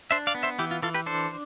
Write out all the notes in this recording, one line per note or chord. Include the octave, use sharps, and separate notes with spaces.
D4 C5 E5
D5 F5
B3
C5 E5
E3 E4 G4
F4
E3 F4 A4
G4 B4
D4 A4 C5